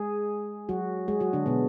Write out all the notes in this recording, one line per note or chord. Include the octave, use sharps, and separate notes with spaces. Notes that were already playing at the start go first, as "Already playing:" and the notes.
Already playing: G#3 G#4
F#3 F#4
G#3 G#4
F#3 F#4
D3 D4
B2 B3